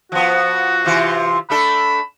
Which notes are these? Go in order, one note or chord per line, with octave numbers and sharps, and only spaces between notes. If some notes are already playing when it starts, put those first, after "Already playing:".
F3 B3 F#4
C3 E3 F4
A3 D4 A4 B5